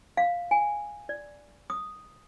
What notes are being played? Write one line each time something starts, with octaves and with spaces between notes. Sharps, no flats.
F5
G#5
D5
D#6